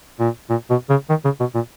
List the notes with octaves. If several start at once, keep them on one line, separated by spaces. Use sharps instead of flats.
A#2
A#2
B2
C#3
D#3
C#3
B2
A#2